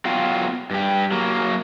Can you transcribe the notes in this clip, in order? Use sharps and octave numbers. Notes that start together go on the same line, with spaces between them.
F#3 B3 F4 F5 G5
G2 G4
F#3 A#3